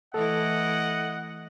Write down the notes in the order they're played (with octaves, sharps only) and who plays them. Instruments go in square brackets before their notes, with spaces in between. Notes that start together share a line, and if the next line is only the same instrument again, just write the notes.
[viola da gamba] E3 A3 E4 [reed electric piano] A4 [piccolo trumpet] D#5 [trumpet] F#5